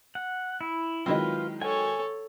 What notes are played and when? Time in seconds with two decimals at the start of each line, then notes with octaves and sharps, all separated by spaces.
0.15 F#5
0.61 E4
1.06 D#3 F#3 G#3 C4 E4 F4 B4 D#5
1.61 A4 C#5 G5 G#5